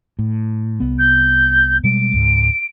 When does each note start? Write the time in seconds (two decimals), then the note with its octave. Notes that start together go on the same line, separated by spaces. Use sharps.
0.19 A2
0.80 C2 B3
0.98 G6
1.84 B2 G3 G#3 D7
2.13 C#2 G#2